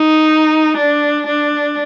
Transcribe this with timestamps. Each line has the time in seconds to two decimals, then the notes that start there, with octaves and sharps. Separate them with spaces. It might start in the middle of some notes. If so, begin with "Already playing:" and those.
Already playing: D#4
0.77 D4
1.27 D4